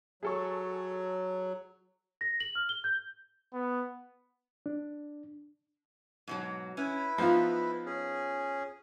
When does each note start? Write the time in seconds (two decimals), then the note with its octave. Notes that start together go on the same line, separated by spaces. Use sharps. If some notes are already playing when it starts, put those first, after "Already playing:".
0.23 F#3 G#4 A4 C#6
2.21 A#6
2.40 F#7
2.55 F6
2.69 G7
2.84 G6
3.53 B3
4.66 D4
6.27 G#2 B2 F#3
6.77 C#4 E4 B4
7.18 F3 B3 D#4 F4
7.86 C#4 G#4